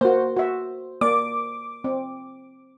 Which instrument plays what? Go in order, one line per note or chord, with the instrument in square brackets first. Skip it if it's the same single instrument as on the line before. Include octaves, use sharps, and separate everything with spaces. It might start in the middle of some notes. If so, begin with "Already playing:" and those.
[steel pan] A#3 F#4 [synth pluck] C5
[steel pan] F#4 E5
[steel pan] A#3 D5 [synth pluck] D6
[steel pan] C4